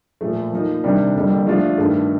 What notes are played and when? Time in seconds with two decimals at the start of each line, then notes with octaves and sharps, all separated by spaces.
0.21 A#2 F3 A3
0.52 F3 A#3 D#4
0.84 C3 D#3 G3 D4
1.15 F2 D3 G3 A#3
1.46 F3 A3 D4 F4
1.78 G2 D#3 A3